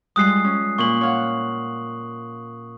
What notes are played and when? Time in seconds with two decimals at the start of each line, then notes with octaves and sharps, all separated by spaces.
0.16 F3 G3 G#3 D#6 F#6 C7
0.44 C#4
0.78 A#2 C#6 F#7
1.01 C#5 F5 F#5